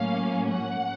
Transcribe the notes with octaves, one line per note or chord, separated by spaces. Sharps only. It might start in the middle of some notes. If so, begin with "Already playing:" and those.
Already playing: A2 F#3 A#3 C#4 F5
F#5